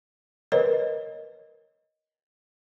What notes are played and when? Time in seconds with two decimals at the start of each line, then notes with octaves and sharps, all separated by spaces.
0.52 A#4 B4 C#5 D#5